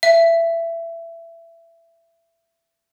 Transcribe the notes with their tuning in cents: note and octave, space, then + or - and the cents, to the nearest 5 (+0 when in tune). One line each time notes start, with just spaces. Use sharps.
E5 +20